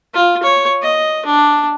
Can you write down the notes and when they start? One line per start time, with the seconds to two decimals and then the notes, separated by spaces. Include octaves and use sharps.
0.14 F4
0.43 C#5
0.82 D#5
1.26 D4